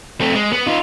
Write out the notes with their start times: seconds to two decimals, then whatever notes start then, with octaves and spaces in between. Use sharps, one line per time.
0.21 A3 C4
0.35 G#3
0.52 B3
0.66 D#4 F4